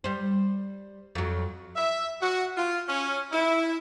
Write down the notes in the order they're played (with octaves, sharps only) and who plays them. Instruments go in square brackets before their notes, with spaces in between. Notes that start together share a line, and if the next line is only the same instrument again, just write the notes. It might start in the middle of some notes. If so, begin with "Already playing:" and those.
[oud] G3 C5
F2 F#3
[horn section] E5
F#4
F4
C#4
E4